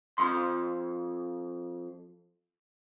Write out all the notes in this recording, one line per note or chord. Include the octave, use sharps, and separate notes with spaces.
F2 C6